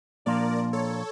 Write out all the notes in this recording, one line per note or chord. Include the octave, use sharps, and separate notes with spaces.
A#2 F3 A#3 D4 F4 A#4 D5
A4 C#5